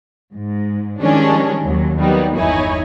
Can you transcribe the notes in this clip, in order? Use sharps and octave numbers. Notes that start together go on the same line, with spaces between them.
G#2
D#3 F3 G3 G#3 C#4 D4
D#2 F#3
F#3 G3 A#3 B3 D#4
G1 E2 D#4 E4 C#5 G#5